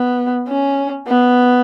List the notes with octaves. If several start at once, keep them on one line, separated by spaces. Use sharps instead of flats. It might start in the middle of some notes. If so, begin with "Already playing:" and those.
Already playing: B3
C#4
B3